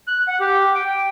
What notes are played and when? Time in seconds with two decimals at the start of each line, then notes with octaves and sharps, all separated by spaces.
0.07 F#6
0.28 F#5
0.40 G4
0.75 G5
0.88 G5